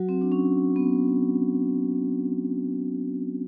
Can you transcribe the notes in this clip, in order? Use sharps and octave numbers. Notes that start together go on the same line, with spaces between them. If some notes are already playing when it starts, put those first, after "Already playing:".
Already playing: F#3 F#4
C4
D4
C#4
B3